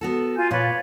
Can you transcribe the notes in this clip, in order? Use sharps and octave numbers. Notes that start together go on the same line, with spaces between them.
B3 F#4 A4
F4 G#5 G6
A#2 F4 B4 C#5 D5